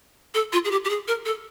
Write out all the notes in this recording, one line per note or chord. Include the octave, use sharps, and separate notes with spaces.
A4
F4
G#4
G4
G4
G#4
A#4
A4